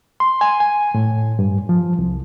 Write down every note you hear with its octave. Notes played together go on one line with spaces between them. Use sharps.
C6
G#5
G#5
A2
G2
F3
C2